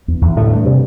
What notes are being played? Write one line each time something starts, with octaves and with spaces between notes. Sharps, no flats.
E2
E2
A2 D3 A3
G2
C3